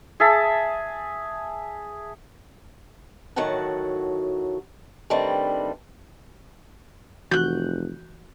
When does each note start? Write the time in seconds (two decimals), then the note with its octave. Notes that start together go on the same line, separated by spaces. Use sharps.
0.20 G#4 E5 A5
3.36 A2 D#3 F#3 F#4 F#5 A5
5.10 D#3 G3 A3 C4 D4 B4
7.31 F1 E3 F#4 F#6 G6